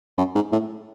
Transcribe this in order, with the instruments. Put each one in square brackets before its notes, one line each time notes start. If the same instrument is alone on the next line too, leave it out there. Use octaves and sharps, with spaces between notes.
[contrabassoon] F#2
G#2
A2